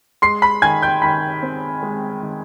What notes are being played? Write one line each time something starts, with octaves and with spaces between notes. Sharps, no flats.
G#3 C6 C7
B5 B6
D#3 G#5 G#6
G5 G6
D#3 B5 B6
C4
G#3
D#3